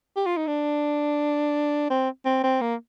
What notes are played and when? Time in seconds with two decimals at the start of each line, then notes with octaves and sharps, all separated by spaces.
0.16 G4
0.26 F4
0.37 D#4
0.47 D4
1.90 C4
2.25 C4
2.44 C4
2.61 A#3